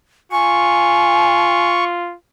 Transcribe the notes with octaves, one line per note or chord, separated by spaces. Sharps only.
F4 G#5 C#6